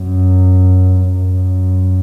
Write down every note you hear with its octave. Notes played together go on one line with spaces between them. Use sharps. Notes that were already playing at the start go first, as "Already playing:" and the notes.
Already playing: F#2
F#2